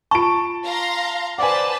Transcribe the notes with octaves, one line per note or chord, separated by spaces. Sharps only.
F4 A5 C#6 D7
F5 A#5 C6
B4 C5 D5 F#5 G#5 A5